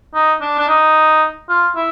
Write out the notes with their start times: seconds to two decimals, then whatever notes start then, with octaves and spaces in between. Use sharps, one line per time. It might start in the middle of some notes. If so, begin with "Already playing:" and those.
0.14 D#4
0.41 D4
0.59 D4
0.68 D#4
1.49 F4
1.76 E4